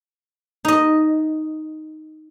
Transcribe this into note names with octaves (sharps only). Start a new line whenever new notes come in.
D#4 D#5